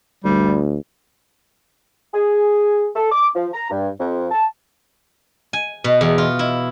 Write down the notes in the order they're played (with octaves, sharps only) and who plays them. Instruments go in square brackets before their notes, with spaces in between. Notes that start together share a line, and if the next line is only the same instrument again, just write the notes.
[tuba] D2 [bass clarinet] G3
[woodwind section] G#4
A4
D6
F3
A#5
G2
F2
A5
[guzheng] G#5
B2
E2
F4
E4